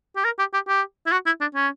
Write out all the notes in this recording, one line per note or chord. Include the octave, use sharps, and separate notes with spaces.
G4
A#4
G4
G4
G4
E4
F#4
E4
D4
C#4